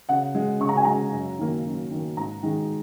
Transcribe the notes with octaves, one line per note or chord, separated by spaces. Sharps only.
C#3 F#5
G#3
C#3 C#6
A#5
G#5
G#3 A#5
F#2
D#3 A#3
F#2
D#3 A#3
G#2 A#5
D#3 G#3